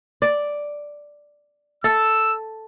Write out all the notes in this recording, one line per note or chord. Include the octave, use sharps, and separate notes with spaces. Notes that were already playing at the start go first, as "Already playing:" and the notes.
D5
A4 E6